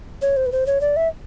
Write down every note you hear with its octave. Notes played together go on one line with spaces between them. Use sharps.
C#5
C5
B4
C5
C#5
D5
E5